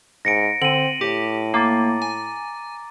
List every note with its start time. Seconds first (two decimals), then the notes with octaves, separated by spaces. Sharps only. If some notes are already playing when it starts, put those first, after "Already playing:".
0.25 G#2 A#6 C#7 D7
0.62 D3 C4 D#7 F#7
1.01 A2 G4
1.54 A#3 A#5 D6 A6
2.02 G#5